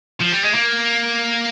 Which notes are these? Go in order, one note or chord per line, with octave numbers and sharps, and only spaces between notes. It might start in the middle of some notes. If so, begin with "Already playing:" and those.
F3
G3
G#3
A#3